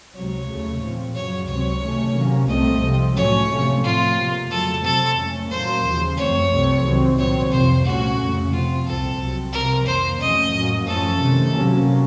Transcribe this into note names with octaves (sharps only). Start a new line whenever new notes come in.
C#2 C3 F#3 C#5
D#2 C#3 A3
A#2 F3 C4
F#2 C#3 F#3 C#5
C#2 C3 F#3 C4 C#5
C3 D#3 A3 C#4
C3 F#3 A#3 C#4
C2 A#2 A3 C4 D#5
C3 F3 C4
A2 F#3 A3 C#4 C#5
C3 F3 A3 C#4
A2 A3 C4 F4
C3 F3 A#3
F2 C#3 F#3 A3 A4
C3 F#3 A3 C4 A4
F2 D#3 A3 C#4
A#2 F#3 A#3 C5
D#2 C#3 F3
F#2 F3 A3 C4 C#5
C2 C3 F3 A3 C4
C2 C3 D#3 F#3 C4
A#2 F#3 C4 C#5
F2 C3 F3 C5
C2 A#2 A3 C#4 F#4
F2 C#3 A3 C#4
C3 F3 C4 F4
C2 A#2 F3 C4 A4
C2 C3 F#3 C4
C3 F3 C4 A#4
F2 D#3 A#3 C5
F2 C3 F3 A3 C#4 D#5
A2 F#3 A#3 C#4
F#2 F3 A3 C#4 A4
C3 D#3 A3
C3 F#3 A#3 C#4